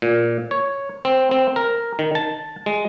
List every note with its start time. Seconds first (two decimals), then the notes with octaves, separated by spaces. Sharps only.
0.02 A#2
0.51 C#5
1.05 C4
1.31 C4
1.56 A#4
1.99 D#3
2.15 A5
2.66 G#3